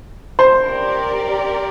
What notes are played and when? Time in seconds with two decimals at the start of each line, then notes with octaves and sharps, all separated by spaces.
0.39 C5
0.63 G4 A#4 D5